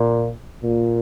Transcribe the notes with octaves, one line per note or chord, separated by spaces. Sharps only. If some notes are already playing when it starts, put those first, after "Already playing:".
Already playing: A#2
A#2